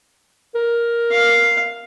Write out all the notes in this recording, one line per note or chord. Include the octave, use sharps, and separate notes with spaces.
A#4
F5